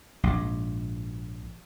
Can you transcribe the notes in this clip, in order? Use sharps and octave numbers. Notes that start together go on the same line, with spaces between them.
A#1 G#2